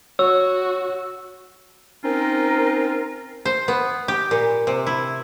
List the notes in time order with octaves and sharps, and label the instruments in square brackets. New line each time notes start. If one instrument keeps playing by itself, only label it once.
[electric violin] F#4 [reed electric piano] C#5 [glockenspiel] E6
[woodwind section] C4 C#4 D#4 F4 A#4
[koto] C5
B3
G4
A#2
C3
E4